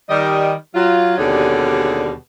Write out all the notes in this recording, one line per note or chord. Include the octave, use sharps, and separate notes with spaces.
D#3 G3 D#5
F#3 F4
D#2 B2 D3 G3 C#4 G#4